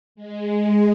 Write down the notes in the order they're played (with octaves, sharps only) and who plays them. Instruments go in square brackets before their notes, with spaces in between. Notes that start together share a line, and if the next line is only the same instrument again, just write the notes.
[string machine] G#3